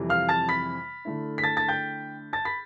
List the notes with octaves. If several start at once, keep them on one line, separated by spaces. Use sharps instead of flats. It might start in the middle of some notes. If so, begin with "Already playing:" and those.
Already playing: F2 C3 E3 G3
F5 F6
A5 A6
B5 B6
D3 A3 E4
B6
A5 A6
A5 A6
G5 G6
A5 A6
B5 B6